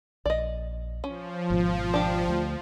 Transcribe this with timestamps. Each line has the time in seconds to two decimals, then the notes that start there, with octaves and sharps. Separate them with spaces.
0.26 A#1 D5 D#5
1.04 F3 C#4
1.50 G#1 G#2 B2
1.94 D4 G4
2.28 D2 G3 A3